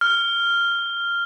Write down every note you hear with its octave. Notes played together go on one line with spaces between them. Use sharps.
F6